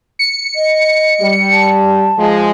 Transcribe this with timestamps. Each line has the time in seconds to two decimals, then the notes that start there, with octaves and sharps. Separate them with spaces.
0.19 C#7
0.56 D#5
1.21 G3
1.51 A5
2.18 F3 G#3